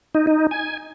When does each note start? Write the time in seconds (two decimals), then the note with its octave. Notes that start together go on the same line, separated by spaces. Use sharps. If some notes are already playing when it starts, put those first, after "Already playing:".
0.15 D#4
0.27 D#4
0.51 G#5